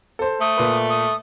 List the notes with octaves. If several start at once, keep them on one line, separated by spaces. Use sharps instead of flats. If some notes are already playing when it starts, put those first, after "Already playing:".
A4 C5
A3 D#6
A#2 B4
D#6